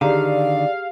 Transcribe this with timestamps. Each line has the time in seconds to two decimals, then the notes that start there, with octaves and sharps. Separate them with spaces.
0.01 D3 D#3 G4 G#4 D5 F5 A#5